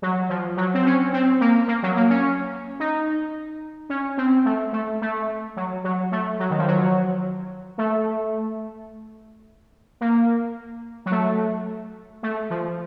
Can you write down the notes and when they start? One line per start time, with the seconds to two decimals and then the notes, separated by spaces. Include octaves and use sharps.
0.02 F#3
0.29 F3
0.57 F#3
0.74 C4
0.85 C#4
1.13 C4
1.41 A#3
1.68 A#3
1.83 F#3
1.96 A#3
2.10 C#4
2.80 D#4
3.89 C#4
4.17 C4
4.45 A3
4.73 A3
5.02 A3
5.56 F#3
5.84 F#3
6.12 A3
6.39 F#3
6.50 D#3
6.58 F3
6.67 F#3
7.78 A3
10.01 A#3
11.06 F#3
11.11 A3
12.23 A3
12.50 F3